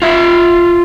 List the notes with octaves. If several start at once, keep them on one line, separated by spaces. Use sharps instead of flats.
F4 E5